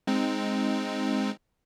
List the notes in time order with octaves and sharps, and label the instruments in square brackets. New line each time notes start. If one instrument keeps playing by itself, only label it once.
[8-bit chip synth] G#3 C4 D#4